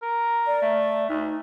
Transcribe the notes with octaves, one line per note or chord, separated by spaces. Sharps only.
A#4
D5
A3
D2 D#4